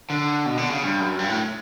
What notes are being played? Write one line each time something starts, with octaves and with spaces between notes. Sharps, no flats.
D3
B2
D3
C#3
G2
F#2
G2
A2